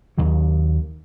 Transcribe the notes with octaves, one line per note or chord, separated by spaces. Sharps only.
D#2 D#3 F#3